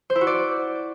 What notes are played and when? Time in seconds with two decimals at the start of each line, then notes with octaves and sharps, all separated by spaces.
0.10 C5
0.15 E4
0.21 F#4
0.27 D5